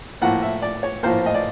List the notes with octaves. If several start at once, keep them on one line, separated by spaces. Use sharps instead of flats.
A2 F3 A#3 F#5
E5
D5
C#5
A2 F3 A#3 C5
D#5
D5